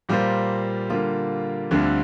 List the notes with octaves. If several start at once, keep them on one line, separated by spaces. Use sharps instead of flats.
A#2 G3 A#3 F4 C5
D3 G3 A#3 F4
D2 D3 G3 C4 F4